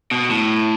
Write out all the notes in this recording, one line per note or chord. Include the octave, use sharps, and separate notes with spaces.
B2
A2